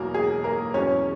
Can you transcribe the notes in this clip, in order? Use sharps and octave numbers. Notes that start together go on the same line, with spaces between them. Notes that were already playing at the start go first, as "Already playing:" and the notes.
Already playing: E1 E2 B2 F#3 A#3 A#4
G#4
A#3 A#4
E2 B2 F#3 C#4 C#5